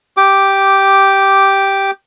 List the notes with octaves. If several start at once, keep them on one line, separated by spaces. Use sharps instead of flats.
G4 D6